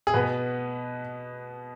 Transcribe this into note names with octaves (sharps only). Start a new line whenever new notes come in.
G#4
B2 B3 B4